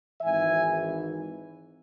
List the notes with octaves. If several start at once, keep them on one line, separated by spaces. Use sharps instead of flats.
G#1 G#2 E3 E5 G#5